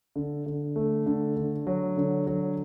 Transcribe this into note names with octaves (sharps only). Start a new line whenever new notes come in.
D3
D3
A3
D3
D3
F#3
D3
F#3